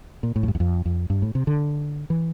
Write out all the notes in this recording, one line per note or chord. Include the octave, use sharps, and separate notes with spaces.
A#2
A2
F2
G2
E2
F2
F2
G2
A2
C3
D3
E3